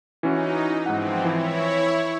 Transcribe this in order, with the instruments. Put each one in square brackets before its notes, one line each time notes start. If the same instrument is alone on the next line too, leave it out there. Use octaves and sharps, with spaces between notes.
[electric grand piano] E3 C#4 F#4 [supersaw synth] D#4
[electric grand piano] G#2 F#5 [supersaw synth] E3 F3 C4
[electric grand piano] E3 [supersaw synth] E4 C#5